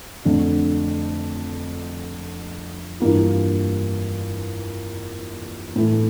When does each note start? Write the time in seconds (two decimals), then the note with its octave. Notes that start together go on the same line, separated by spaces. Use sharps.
0.25 F2 D3 A3 D4
3.00 G2 E3 A#3 F4
5.76 A2 E3 A3